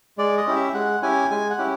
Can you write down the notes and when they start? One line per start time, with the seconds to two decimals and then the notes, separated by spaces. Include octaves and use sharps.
0.18 G#3 D5
0.38 D#5
0.47 C#4 E4 G4
0.55 E5
0.74 G#3 F#5
1.02 C#4 E4 G4 G#5
1.30 G#3 G#5
1.50 F#5
1.58 C#4 E4 G4